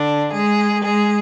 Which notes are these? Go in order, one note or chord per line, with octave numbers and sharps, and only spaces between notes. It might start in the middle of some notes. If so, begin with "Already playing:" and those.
Already playing: D3 D4
G#3 G#4
G#3 G#4